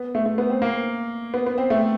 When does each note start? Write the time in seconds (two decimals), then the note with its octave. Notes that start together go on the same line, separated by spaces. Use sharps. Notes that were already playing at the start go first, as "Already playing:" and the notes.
Already playing: B3
0.15 A3
0.26 A3
0.38 B3
0.50 C4
0.62 A#3
1.34 B3
1.47 B3
1.58 C4
1.70 A3